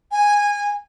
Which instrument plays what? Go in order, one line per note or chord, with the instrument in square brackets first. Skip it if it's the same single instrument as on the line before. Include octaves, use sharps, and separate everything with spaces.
[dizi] G#5